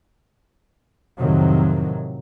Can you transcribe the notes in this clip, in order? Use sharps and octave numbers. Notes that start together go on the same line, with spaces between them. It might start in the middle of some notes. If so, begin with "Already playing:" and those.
F2 A2 C3 D#3 F#3